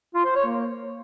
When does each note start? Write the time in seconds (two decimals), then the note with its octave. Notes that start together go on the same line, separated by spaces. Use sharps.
0.14 F4
0.25 C5
0.36 C#5
0.46 A#3